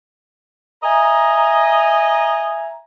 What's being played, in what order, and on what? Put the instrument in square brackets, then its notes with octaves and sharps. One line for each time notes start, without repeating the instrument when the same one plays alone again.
[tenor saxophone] D#5 [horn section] E5 G#5 A#5